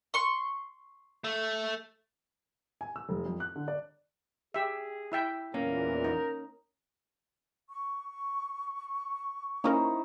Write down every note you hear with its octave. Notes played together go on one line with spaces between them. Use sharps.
C6 C#6
A3
G#5
E6
F1
F2
F#6
D3
D5
G4 G#4 E5
E4 E5 G5
E2 A#2 E3 A#3 C#4 A#4
D#4
C#6
A#3 C#4 D#4 E4 A#4 C5